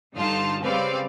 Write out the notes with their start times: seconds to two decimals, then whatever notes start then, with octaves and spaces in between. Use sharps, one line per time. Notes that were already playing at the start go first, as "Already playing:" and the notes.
0.14 G2 D3 D#4 F4 A5 F6
0.62 C#3 G3 C4 B4 D5 F5